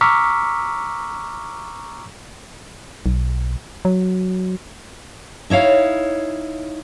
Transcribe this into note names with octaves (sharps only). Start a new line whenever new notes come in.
A#5 C#6 D6 E6 F6 B6
B1
F#3
D#4 E4 C#5 F5